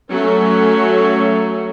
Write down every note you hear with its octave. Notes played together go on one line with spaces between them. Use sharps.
F#3 A3 C#4 F#4